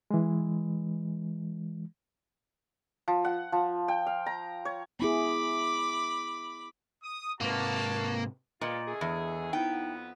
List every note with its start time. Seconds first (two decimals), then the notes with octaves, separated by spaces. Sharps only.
0.11 E3 G#3
3.08 F3
3.25 F#5
3.52 F3
3.88 G5
4.07 F5
4.26 A#5
4.65 C#5
5.00 B3 E4 G#4 B5 D6
7.02 D#6
7.41 G#2 C3 A#3 F#4 B4 A5
8.61 A#2 G#3 B3 F4 D#5
8.88 D3 A3 G#4
9.01 E2
9.53 F2 B3 D#4 E4 G5
9.73 F#5